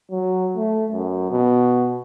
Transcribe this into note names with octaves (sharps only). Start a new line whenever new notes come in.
F#3
A3
F#2
B2